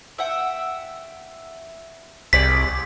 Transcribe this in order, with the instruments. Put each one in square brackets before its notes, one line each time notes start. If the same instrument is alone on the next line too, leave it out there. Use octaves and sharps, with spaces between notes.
[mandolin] E5 F#5 G5
[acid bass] C2 [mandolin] G4 G#4 D5 [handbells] B6